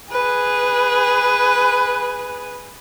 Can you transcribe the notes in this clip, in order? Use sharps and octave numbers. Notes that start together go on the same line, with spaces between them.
G#4 B4